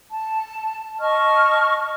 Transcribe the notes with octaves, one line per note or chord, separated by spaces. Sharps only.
A5
D#5 A5 C#6 F6